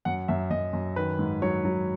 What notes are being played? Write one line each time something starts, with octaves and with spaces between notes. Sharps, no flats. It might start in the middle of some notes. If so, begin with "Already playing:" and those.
F#2 F#5
F#2 E5
F#2 D#5
F#2
D#3 B4
G#2
F#3 C#5
F#3